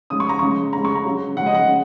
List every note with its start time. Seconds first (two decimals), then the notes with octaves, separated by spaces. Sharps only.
0.10 C#3 G#3 D#6
0.20 C#6
0.29 A#5
0.39 C#3 G#3 C#6
0.73 C#3 G#3 A#5
0.85 C#6
0.95 A#5
1.05 C#3 F#3
1.36 C#3 G#3 F#5
1.46 D#5
1.54 F#5
1.68 C#3